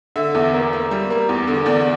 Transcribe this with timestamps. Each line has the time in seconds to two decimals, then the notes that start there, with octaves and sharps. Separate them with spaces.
0.16 D3 E5
0.35 E2
0.54 A#3
0.73 A#3
0.91 G3
1.10 A#3
1.29 E2
1.47 D3
1.66 E2 D5